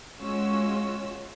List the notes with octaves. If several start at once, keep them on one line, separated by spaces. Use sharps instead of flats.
G#3 C#4 F4 F#4 E6